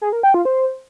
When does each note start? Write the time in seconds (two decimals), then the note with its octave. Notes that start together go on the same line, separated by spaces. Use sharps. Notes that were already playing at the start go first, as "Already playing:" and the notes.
0.01 G#4
0.12 A#4
0.23 G5
0.34 F4
0.45 C5